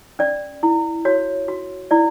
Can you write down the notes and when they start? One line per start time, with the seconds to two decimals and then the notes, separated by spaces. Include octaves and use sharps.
0.19 C#4 D5
0.63 E4
1.05 F#4 C#5
1.48 F#4
1.91 E4 D5